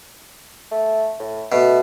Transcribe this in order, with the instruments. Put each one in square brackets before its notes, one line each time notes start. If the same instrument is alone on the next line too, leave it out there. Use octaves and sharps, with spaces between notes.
[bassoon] A3
A2
[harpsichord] B2 [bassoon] A3